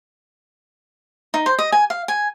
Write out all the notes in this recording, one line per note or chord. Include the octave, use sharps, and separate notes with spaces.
D#4
C5
D#5
G#5
F5
G#5